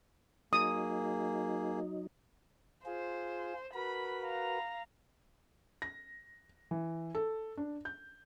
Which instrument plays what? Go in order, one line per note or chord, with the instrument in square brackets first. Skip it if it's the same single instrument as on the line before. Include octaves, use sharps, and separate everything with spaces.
[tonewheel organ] F#3 D#4 [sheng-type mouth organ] A#3 G#4 [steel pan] D#6
[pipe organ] F4 G#4 [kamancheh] C5
[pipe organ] F#4 A#4 B4 [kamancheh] B5
[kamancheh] F5 A#5
[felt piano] A#6
E3
A4
D4
G6